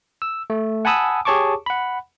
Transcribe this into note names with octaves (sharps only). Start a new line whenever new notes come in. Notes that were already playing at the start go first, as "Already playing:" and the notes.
E6
A3
F#5 G#5 A5 B5 D#6 E6
G4 G#4 C#5 A5 C#6 D6
F#5 B5